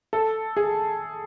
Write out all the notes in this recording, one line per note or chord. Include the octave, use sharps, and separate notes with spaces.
A4
G#4